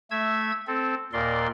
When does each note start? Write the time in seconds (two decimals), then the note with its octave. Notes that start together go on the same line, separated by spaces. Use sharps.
0.11 A3 E5 E6 G#6
0.67 C4 A4
1.13 D#2 A#2 A#4 D5 C6